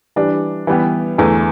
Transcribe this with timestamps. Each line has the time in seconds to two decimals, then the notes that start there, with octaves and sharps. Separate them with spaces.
0.16 E3 G3 D4
0.67 E3 G3 B3 G4
1.18 E2 E3 A3